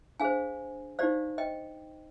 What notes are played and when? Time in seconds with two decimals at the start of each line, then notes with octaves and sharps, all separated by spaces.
0.20 D4 G#4 C5 F5 G#5
0.99 D#4 G4 C5 D5 F5
1.38 D#5 G5